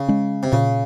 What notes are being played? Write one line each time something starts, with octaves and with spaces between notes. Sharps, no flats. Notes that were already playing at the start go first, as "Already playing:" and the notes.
Already playing: C#3
G#3 C#4
C3
A#2 C#3